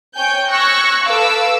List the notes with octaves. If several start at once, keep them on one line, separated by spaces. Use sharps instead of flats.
C#5 G5 G#5 G6
C#6 E6 F#6 G#6 A#6
A4 B4 F5 D6 E6